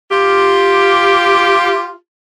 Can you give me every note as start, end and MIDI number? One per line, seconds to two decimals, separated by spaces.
0.12 1.93 65
0.12 1.93 67